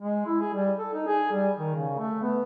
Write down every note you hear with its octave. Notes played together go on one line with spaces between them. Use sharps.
G#3
E4
G#4
G3
A4
D#4
G#4
G3
D#3
C#3
A3
B3